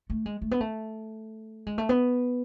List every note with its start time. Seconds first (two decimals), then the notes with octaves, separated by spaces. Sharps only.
0.10 A3
0.26 G#3
0.42 A3
0.51 B3
0.61 A3
1.66 G#3
1.78 A3
1.89 B3